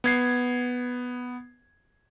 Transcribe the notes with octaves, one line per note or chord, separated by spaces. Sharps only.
B3 G#6 C7